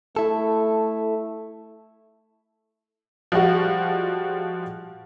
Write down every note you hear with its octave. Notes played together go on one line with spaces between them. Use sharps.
A3 E4 A4
F3 G3 G#3 F#4